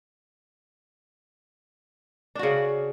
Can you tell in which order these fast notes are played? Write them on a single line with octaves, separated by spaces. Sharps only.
D4 F#4 C#3